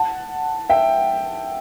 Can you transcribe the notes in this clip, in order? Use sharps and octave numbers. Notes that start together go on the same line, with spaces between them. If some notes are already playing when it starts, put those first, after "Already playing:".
Already playing: F#5 A5
E5 G5